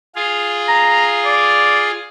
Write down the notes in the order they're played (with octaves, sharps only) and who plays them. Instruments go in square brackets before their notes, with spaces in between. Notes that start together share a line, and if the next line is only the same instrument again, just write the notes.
[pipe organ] F4 G#4 F5
[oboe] A#5
D5